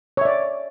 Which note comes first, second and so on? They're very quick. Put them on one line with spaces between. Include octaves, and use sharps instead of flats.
C#5 E5 D5